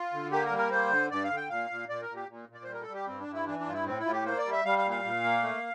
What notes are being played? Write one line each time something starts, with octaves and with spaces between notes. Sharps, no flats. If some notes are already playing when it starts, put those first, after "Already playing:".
Already playing: F4
D3
A#3 G4
A#4
G3
A#4
A#3 C5
D3
G2 D5
F5
D3
G5
A#2 F5
A#2
A#2 D5
A#4
A#2
G4
A#2
A#2
D5
C5
G3
A#4
A4
G3
G4
G2 C4
D4
G2
E4
E3 D4
D4
G2 F4
E4
A2 C4
E4
A2 F4
G4
A#3 C5
D5
G3
E5
G3 F5
F5
A#2
F5
A#2
A#3
A3